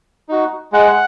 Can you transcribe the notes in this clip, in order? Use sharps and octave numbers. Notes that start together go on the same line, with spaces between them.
D#4 F#4
G#3 F#5